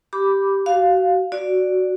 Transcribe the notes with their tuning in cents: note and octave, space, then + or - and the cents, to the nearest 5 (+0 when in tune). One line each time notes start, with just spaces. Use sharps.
G4 +0 B5 +0 D6 -5
F#4 +30 F5 +0
F#4 +0 D5 +0